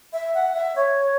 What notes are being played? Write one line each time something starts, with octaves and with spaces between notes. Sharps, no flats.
E5
F#5
E5
C#5